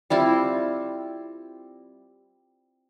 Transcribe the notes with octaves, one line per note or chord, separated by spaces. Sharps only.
G3 C4 E4 F4